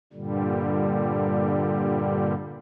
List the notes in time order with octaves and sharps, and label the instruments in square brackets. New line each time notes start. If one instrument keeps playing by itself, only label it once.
[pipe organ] G2 A#2 D3 G3